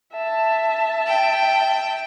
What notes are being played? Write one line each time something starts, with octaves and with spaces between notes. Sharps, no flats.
E5 A5
G5